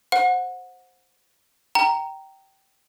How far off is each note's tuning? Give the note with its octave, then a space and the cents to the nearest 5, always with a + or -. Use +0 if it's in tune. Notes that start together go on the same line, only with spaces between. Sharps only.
C5 +0 F#5 -25
G5 -15 A#5 -5